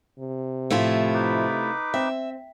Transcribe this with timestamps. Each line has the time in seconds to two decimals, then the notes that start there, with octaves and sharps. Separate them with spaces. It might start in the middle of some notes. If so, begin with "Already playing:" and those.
0.19 C3
0.70 A2 F3 A3 E4 F4
1.14 D#4 B4 D6
1.94 C4 E5